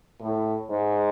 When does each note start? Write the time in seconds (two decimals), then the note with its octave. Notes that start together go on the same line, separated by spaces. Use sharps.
0.20 A2
0.70 G#2